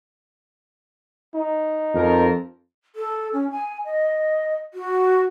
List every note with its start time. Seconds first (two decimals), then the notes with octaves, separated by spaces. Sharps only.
1.35 D#4
1.95 F2 F3 A#4
2.95 A4
3.33 C#4
3.51 G#5
3.85 D#5
4.74 F#4